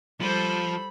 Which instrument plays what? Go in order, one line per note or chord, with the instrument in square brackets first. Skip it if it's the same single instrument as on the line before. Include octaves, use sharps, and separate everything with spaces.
[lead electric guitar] F3 [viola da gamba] G3 A4 C5 [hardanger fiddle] B5